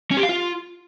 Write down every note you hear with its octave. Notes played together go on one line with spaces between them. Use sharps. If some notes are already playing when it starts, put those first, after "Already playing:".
C#4
G4
F5
F4